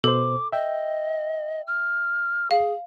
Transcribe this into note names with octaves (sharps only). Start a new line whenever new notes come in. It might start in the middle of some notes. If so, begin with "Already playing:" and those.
B2 A4 C5 D6
D#5 E5 G5
F6
G#4 F5